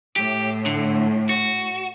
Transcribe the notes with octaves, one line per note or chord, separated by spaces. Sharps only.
A2 G4
D3
F#4